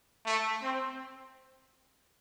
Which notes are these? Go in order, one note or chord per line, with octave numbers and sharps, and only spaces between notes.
A3
C4